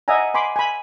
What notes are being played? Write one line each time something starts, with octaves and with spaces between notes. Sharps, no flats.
D#5 E5 F#5 G#5 A#5
G#5 B5 C6 D6
G#5 B5